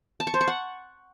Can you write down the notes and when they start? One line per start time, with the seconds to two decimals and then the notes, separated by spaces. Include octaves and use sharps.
0.20 A5
0.27 C#6
0.34 C5
0.41 C#6
0.48 F#5